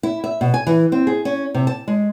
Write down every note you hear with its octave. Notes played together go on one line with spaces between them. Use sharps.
E4
E5
B2
G#5
E3
C4
G#4
C#4
C3
A5
G#3